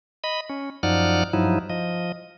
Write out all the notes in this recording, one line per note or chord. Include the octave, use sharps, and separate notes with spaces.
D#5 B5
C#4
F#2 F3 D#4 D5 F#5 F6
G2 F3 F#3 D#4 E4
F3 D#5